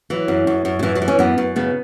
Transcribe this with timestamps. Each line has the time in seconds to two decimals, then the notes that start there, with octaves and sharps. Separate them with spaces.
0.10 E3 F#3
0.28 F#2
0.47 F#2
0.65 F#2
0.79 F#3
0.83 F#2 E3
0.95 F#3
1.02 E3
1.08 C#4
1.19 F#2 B3
1.38 F#2
1.56 C#3 B3